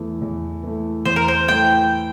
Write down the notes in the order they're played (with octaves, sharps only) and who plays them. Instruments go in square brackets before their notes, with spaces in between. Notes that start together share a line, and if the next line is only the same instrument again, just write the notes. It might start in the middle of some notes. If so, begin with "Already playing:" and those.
Already playing: [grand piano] E2 E3 A3
E2
E3 A3
[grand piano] E2 [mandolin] C5
[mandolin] A#4
C5
[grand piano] E3 A3 [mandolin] G5